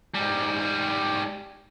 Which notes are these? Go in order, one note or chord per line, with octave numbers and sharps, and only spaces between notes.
G#2 G3